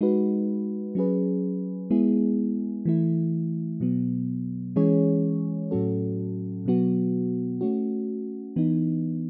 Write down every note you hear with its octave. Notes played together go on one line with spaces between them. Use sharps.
G#3 D#4 F#4 B4
F#3 C#4 G#4 B4
G#3 B3 E4 G#4
E3 A3 E4
B2 F#3 B3
E3 G#3 C#4 G#4 C#5
A2 F#3 C#4 F#4 A4
B2 F#3 B3 F#4
A3 C#4 F#4
E3 B3 D#4